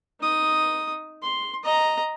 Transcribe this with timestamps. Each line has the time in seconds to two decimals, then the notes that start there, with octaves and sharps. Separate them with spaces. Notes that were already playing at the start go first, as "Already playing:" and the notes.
0.20 D#4 D#6
1.22 C6
1.63 D#5 A#5